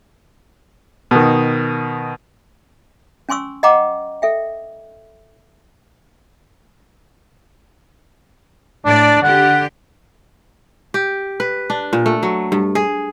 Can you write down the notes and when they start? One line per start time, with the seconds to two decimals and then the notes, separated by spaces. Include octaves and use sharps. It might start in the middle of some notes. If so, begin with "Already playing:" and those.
1.11 B2 D#3
3.29 C#4 G#5 C6 C#6 E6
3.63 D#5 F#5 G5 A#5 D6
4.22 A4 E5 G5
8.85 A2 D4 D5
9.22 D3 G4 F#5
10.94 G4
11.40 B4
11.70 D4
11.93 A#2
12.06 A3
12.23 F#3
12.52 G2
12.75 G#4